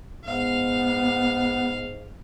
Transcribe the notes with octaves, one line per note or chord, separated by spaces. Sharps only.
G#2 B3 F5